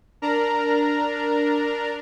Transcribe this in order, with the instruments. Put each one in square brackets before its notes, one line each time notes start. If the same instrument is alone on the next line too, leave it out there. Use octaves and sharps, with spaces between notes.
[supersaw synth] D4 A#4 A#5